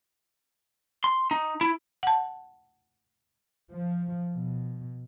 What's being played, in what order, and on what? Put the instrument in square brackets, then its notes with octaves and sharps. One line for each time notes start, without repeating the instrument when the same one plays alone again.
[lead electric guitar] C6
D#4
E4
[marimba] F#5 A5
[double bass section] F3
B2